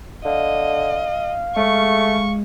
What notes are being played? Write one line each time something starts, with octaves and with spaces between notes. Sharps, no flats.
D3 D#5 F5
G#3 A3 C#6